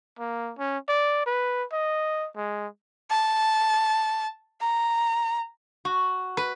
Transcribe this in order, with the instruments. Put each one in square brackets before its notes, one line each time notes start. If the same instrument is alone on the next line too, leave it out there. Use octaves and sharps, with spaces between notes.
[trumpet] A#3
C#4
D5
B4
D#5
G#3
[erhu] A5
A#5
[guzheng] F#4
B4